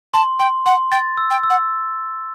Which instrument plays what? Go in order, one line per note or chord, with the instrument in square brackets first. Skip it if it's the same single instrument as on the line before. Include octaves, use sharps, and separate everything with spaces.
[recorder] A5 [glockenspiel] C6
[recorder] G5 [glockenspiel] C6
[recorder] F#5 [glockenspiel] C6
[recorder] G5 [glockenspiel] A6
[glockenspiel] E6
[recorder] G5
[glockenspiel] E6
[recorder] F#5